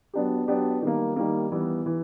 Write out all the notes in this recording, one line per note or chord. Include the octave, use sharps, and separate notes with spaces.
F#3 B3 D4 G4
F#3 B3 D4 G4
D#3 G3 A#3
D#3 G3 A#3
E3 G3 B3
E3